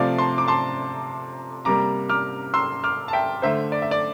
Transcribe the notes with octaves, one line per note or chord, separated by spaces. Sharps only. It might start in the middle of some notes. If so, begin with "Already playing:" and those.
Already playing: C3 F3 A3 D5 F5
A5 C6
D6
A5 C6
C3 G3 A#3 A#5 D6
D6 F6
C6 E6
D6 F6
A5
E5 G5
D3 A3 C5 E5
D5
E5
D5